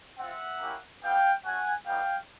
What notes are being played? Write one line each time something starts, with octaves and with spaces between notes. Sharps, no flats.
C4 F4 E5 F#5
A#3 C#4 E4 G4
G3 B3 E4 F5 G5
A3 C#4 F#4 F#5 G#5
G3 B3 D#4 F#4 F5 G5